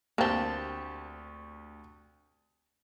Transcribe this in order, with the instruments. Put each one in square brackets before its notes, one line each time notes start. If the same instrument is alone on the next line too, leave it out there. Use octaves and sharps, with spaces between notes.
[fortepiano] D2 G4 A5 [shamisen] A#3 C4